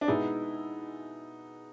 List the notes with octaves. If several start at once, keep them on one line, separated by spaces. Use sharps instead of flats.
D4
B2 G#3 B3 D#4 E4 G#4